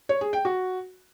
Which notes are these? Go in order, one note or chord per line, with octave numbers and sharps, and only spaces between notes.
C#5
G#4
G5
F#4